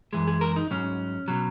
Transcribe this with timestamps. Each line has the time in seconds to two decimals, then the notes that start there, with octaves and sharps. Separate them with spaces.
0.13 F#2 E3 G#3 G#4
0.27 G#4
0.41 A#4
0.56 D#4
0.71 G#2 F#3 C#4
1.28 B2 F#3